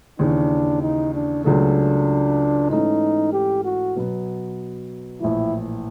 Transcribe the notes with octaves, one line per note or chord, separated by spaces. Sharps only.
D#2 C#3 E3 D4
D#4
D4
C#2 C#3 F#3 A3 D4
G#2 E3 A3 C#4 D#4
G4
F#4
B2 F#3 B3
A#1 A2 E3 E4